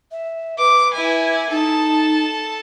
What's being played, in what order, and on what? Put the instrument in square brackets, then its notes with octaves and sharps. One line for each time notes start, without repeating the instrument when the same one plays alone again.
[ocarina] E5
[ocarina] B4 [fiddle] D6
[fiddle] E4 G#5
[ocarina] D#4 [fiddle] A4 A5